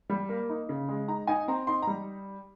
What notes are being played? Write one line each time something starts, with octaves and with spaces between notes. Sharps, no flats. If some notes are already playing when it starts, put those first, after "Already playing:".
G3
A#3
D#4
C#3
G#3
D#4 A#5
D#4 G#5
C4 A#5
D#4 C6
G3 A#5